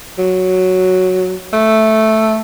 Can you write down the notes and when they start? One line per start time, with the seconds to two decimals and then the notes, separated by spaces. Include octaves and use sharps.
0.18 F#3
1.53 A3